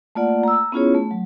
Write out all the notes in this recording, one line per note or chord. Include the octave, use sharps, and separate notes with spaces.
A3 A#3 F4 D5 F#5
A#5 E6
B3 C#4 E4 F4 G#4 C#5
A3
F#3